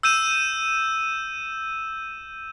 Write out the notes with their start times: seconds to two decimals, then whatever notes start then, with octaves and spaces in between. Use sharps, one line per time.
0.03 E6 G6 D#7 E7